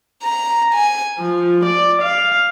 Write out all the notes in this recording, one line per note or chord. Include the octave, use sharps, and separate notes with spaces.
A#5
G#5
F3
D5
F5